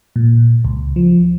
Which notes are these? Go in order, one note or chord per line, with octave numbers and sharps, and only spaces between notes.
A#2
C#2
F3